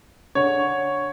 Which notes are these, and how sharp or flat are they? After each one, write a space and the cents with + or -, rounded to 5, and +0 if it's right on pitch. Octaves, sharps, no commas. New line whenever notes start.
D3 -5 C#5 +0